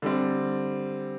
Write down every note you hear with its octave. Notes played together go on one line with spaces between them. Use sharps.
D3 G3 C4